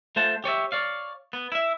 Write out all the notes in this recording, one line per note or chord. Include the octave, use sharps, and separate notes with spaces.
A3 F4 C5 F#5 A5
G4 C#5 D5 E5
C#5 D5 F5
B3
E4 E5